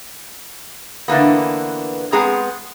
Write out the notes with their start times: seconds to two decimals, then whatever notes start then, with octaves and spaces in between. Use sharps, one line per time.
1.08 D3 E3 A#3 B3
2.12 G#3 B3 C4 G#4 G#5 A#5